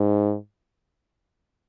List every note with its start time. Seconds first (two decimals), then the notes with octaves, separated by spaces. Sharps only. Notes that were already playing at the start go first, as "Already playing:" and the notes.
Already playing: G#2